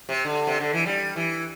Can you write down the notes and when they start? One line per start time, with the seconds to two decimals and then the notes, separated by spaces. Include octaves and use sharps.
0.09 C3
0.25 D3
0.47 C3
0.60 D3
0.73 E3
0.86 G3
1.16 E3